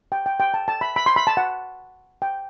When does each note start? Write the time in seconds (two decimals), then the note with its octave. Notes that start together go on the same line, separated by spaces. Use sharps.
0.12 G5
0.26 G5
0.40 G5
0.54 A5
0.68 A5
0.81 B5
0.96 B5
1.06 C6
1.16 B5
1.27 A5
1.37 F#5
2.22 G5